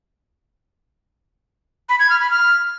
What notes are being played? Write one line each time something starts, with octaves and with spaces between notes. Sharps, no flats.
B5
G#6
F6
B5
F6